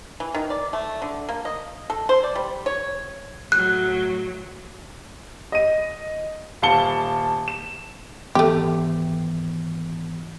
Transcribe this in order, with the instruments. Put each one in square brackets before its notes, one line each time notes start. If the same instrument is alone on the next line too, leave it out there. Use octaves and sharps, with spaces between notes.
[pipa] E3
D#3
D5
A3
D3
A#3
D#5
A4
C5
D5
G3
C#5
[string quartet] A2 F#3 [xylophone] F#6
[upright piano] D#5 D#7
D#1 F5 A5 C#7 G7
E7
[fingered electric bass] G#1 E3 B3 [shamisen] A3 G4